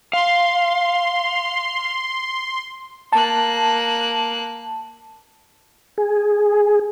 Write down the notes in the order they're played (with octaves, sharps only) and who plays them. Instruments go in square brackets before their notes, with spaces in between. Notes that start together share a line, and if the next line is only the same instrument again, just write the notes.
[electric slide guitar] F5 [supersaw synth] C6
[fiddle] A#3 F#6 [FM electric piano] A5
[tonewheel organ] G#4